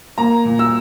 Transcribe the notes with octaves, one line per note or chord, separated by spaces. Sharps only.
A#3 A#5
A#2
E6